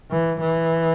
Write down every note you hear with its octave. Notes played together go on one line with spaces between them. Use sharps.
E3
E3